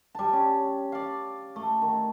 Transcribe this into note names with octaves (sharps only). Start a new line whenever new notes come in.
G3 A5
C#4
D5 F5
A3
D#3